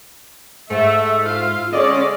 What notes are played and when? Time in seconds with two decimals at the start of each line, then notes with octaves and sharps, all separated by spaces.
0.71 G#2 A3 E5
1.26 F4 E5 F5
1.72 D3 G#3 C#4 D5 D#5